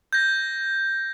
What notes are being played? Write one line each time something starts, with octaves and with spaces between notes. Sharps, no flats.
G6 G#6 A#6